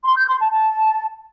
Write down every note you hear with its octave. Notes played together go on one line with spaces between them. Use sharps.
C6
G6
C6
A5
A5